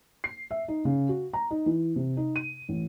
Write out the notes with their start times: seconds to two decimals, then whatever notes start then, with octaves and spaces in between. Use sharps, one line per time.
0.24 C7
0.51 E5
0.68 D#4
0.85 C#3
1.09 F#4
1.33 A#5
1.51 D#4
1.66 E3
1.96 C3
2.17 D#4
2.36 D#7
2.69 A1